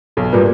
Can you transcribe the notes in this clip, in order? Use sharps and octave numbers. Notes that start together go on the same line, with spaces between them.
B1 A4
A#2 G3 A#3 B4